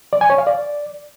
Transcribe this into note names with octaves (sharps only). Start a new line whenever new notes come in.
D5
G#5
C#5
F5
D5